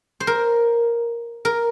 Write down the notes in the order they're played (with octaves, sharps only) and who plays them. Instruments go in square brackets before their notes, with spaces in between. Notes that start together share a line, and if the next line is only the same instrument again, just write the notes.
[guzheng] C5
A#4
A#4